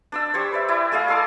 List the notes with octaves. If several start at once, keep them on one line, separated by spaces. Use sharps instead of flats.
D4 D5 E6
G4 C5 C#5
B4 D5 E5
E4 D5 G#5
A3 G#4 D#5 F5
G#4 A4 C6 D6